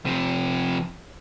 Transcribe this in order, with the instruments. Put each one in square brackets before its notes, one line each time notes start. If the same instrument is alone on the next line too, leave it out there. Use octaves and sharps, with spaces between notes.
[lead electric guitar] C3 F3